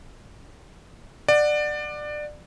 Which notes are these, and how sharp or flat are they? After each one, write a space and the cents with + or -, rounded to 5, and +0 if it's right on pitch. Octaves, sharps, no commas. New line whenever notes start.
D5 +20 F#5 -5